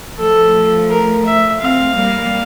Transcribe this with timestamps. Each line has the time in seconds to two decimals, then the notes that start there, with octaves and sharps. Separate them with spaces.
0.17 F3 A3 A4
0.90 A#4
1.25 E5
1.61 A3 C4 F5
1.97 G3 A#3